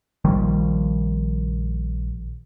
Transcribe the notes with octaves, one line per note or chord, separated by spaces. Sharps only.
A#1 D#3 F3 G3